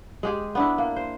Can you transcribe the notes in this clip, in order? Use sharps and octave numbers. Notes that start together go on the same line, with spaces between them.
G#3 G4 G#4
B3 D4 E4
A#3
C5